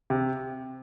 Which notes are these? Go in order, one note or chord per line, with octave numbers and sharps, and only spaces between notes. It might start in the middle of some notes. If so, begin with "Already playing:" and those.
C3